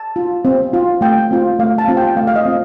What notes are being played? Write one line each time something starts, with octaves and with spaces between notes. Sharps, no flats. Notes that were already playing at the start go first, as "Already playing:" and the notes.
Already playing: A5
F4
C4
F4
A3 G5
C4 F4
A3 F5
A5
C4 F4
G5
A3 F5
F5
D#5
C4 F4